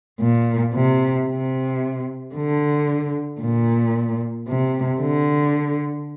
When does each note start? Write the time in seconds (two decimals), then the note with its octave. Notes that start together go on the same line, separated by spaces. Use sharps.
0.20 A#2
0.73 C3
1.27 C3
2.35 D3
3.41 A#2
4.48 C3
5.01 D3